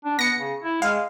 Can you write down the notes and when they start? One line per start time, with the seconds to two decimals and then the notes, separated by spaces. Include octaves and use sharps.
0.05 D4
0.19 B3 A#6 C#7
0.38 C#3
0.63 E4
0.82 G#3 F5